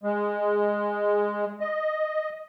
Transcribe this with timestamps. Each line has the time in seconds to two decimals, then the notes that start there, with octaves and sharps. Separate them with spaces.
0.03 G#3
1.60 D#5